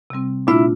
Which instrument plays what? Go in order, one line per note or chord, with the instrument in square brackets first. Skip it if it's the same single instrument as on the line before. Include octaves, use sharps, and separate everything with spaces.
[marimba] C3 G3 C4
[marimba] A#2 A3 D4 F4 [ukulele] E4